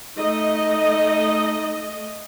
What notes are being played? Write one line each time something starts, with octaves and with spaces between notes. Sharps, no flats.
A3 D#4 D#5